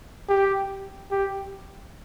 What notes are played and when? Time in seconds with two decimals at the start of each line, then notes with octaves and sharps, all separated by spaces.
0.29 G4
1.11 G4